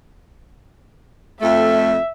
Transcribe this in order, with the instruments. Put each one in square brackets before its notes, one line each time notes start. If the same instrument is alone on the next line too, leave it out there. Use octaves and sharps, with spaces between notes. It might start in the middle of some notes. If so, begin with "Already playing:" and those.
[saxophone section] F2 A3 [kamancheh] E5